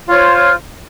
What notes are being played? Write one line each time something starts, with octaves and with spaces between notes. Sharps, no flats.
F4 C5 C#5